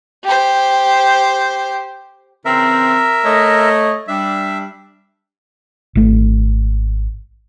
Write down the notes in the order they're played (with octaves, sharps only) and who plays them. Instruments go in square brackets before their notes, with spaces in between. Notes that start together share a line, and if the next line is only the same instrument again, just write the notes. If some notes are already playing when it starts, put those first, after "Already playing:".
[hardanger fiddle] G4 C5
[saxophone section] C#3 E3 C4 [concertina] A#4 E5
[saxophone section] A3 C#5 D#5
[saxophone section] G3 D4 [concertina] E5
[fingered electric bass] G#1 A3